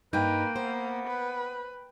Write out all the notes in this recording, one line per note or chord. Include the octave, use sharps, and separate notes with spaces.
G2 A#3 D#4 B4 G5
B3 C5
B4